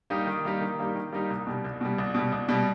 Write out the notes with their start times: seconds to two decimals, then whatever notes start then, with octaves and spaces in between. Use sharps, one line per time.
0.10 G3 A#3 D#4 G4
0.27 D#3
0.45 G3 A#3 D#4 G4
0.61 D#3
0.79 G3 A#3 D#4 G4
0.95 D#3
1.12 G3 A#3 D#4 G4
1.30 C2
1.47 B2 G3
1.65 C2
1.81 B2 G3
1.98 C2
2.15 B2 G3
2.32 C2
2.49 B2 G3